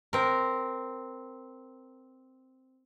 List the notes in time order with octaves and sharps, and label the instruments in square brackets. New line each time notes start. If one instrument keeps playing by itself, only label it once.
[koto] C4 A#4